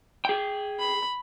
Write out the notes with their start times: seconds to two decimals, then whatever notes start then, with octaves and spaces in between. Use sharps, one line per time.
0.25 G#4 G5
0.80 B5